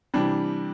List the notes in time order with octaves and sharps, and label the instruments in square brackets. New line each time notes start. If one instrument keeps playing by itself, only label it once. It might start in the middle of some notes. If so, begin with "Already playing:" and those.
[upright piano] C3 E3 G3 D4